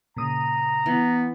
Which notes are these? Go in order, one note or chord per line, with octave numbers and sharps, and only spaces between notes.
A#2 C#3 A#5 D#6
E3 B3